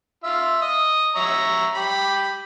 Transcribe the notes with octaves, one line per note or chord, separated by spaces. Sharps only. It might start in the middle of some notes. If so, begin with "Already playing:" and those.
F4 E5
D#5
C#5 E5 A#5
G4 B5